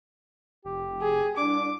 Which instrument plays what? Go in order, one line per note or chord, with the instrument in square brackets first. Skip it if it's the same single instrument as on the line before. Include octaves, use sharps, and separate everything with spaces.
[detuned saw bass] F1 [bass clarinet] G4
[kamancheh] G#4
[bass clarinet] C2 [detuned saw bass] D4 [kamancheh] D6